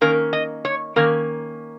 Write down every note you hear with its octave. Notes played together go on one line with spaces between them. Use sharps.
D#3 A#3 C#4 A#4
D#5
C#5
D#3 A#3 C#4 A#4